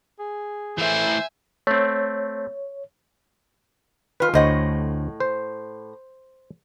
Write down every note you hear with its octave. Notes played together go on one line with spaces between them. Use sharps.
G#4
E3 A3 C5 E5 G#5
A3 C4 C#5
D#3 F4 B4
D2 A2 C5 C#5 D#5 F#5
C5